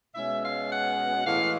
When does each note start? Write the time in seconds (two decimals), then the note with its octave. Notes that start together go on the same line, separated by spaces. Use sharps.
0.15 B2 G#3 C#4 E5
0.43 F5
0.70 F#5
1.26 A2 E3 G#3 F5